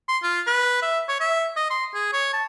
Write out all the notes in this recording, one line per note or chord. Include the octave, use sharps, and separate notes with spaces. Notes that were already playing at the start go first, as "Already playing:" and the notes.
C6
F4
B4
E5
C#5
E5
D#5
C6
G#4
C#5
A5